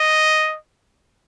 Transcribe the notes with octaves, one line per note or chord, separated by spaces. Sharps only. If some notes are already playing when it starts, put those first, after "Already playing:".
Already playing: D#5